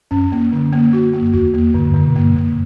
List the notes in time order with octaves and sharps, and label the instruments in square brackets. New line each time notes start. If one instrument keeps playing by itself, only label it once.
[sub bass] F#2 [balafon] C#4
[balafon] A#3
D3
A#3
F#4
A#3
[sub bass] E2 [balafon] F#4
[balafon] A#3
[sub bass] F#2 [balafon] D3
[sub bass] G2
[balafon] D3
[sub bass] B2
[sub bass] G2 [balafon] A#3
[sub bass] F#2 [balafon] A#3